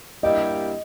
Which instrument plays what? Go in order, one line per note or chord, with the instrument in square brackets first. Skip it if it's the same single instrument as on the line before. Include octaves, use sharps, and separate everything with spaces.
[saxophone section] G2 G3 A#3 E4 G4 [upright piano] D#5